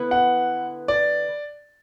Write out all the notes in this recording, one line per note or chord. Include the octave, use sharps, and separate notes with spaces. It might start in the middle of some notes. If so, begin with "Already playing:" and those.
Already playing: D3 B3 E4 B4
F#5
D5